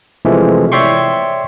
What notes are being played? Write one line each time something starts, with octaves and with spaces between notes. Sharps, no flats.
C3 E3 F3 G#3 A3
C#5 D5 E5 G5 C6 C#6